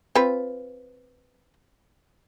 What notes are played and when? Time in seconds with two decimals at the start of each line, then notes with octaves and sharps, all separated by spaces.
0.15 C4 F4 B4